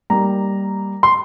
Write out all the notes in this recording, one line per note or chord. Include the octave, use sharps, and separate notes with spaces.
G3 A#3 D#4 A#5
C6